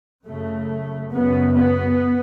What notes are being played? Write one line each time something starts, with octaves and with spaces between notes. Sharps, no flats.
F#2 C#3 A3
F#2 C#3 B3
B3